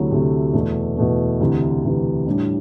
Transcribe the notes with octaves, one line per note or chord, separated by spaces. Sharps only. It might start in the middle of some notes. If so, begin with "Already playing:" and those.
Already playing: D2 C3 F#3 A3 E4
D2 C3 F#3 A3 E4
E2 B2 A3
E2 B2 A3
D2 C3 E3
D2 C3 E3
A2 G3 D4